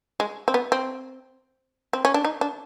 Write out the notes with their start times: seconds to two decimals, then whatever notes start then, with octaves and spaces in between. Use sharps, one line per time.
0.20 G#3
0.48 C4
0.54 B3
0.72 C4
1.93 C4
2.05 C#4
2.14 D4
2.25 D#4
2.41 D4